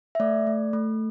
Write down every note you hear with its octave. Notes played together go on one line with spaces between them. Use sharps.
E5
A3 D5
A3
A3